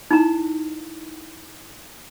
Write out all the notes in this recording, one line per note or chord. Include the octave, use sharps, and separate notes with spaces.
D#4 E4 A#5